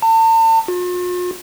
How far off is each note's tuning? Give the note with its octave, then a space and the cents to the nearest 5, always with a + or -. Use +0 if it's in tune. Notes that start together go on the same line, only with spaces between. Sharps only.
A5 +40
F4 +45